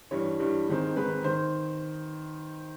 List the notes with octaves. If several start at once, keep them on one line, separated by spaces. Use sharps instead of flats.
G2 E3 G3 C#5
G2 E3 G3
G#2 D#3 G#3 C4
G#2 D#3 G#3 C4 B4
D#3 C5